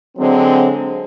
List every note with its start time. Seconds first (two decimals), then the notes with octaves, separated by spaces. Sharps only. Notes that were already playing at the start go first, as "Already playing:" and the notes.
0.17 D3 F#3 G#3 C4